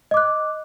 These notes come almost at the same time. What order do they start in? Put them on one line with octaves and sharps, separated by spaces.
D#5 D6 F#6